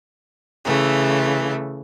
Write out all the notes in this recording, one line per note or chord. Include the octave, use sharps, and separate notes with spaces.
C#3 E3 A3